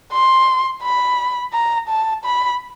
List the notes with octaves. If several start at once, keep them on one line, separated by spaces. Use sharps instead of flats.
C6
B5
A#5
A5
B5